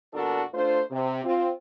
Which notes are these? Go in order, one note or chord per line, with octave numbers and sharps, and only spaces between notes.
E2 A#2 D4 F#4 A4 A#4
A3 D4 F4 C5
C3
C4 F4